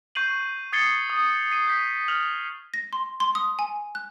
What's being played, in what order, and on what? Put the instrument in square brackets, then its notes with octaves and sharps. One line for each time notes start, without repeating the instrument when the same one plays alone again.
[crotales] C#6 G6 C7 D#7 F#7
D#6 G#6 A6 C7 C#7 G7
D#6
C7 D#7
G6 B6 C7
F6 F7 F#7
[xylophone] A#6
C6
C6
D#6
G#5
F#6